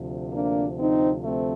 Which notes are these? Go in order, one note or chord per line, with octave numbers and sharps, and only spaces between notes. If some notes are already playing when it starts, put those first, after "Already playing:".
Already playing: D2 C3 F3
A#3 D4
C4 D#4
A3 C4